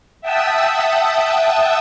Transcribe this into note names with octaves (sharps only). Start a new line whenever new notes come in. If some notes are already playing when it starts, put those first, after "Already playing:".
E5 F#5 G5 A5 D#6 E6